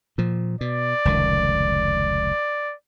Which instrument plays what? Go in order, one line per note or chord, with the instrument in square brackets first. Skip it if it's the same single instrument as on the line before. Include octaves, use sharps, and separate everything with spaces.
[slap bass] A#2 F3
[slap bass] B2 [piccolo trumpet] D5
[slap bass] F1 C#2 D#3